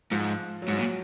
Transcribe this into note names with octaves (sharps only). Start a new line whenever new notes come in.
G#2 F3
F#3
G#2
A#2